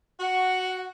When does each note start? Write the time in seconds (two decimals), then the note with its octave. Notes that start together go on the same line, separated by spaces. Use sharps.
0.20 F#4 F#5